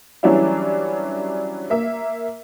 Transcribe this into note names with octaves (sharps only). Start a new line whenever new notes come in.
E3 F#3 G3 C#4 D4 E4
A#3 E5